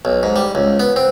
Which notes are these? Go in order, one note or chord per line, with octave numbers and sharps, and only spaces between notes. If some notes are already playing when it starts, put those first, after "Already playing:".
B1
G#2
G3
C#2
B3
C4